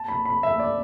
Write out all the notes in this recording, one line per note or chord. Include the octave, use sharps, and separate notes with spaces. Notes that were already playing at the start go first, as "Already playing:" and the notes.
Already playing: A5
B5
B5
E5
D5